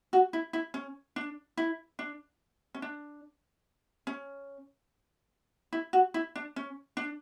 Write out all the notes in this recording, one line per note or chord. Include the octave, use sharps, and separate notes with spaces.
F#4
E4
E4
C#4
D4
E4
D4
C#4
D4
C#4
E4
F#4
E4
D4
C#4
D4